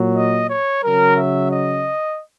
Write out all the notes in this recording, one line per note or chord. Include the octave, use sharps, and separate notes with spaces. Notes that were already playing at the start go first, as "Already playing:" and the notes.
Already playing: A#2 F#3
D#5
C#5
C#3 F#3 A#4
E5
D#5